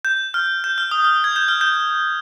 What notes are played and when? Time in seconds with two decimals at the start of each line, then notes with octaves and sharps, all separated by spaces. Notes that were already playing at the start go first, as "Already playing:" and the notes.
0.05 G6
0.34 F6
0.64 G6
0.78 F6
0.91 D#6
1.04 F6
1.24 G#6
1.36 G6
1.48 F6
1.61 G6